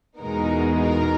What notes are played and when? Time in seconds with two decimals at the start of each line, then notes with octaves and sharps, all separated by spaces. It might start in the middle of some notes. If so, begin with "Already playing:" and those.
0.18 E2 B2 G#3 B3 D#4 A#4
0.78 A#4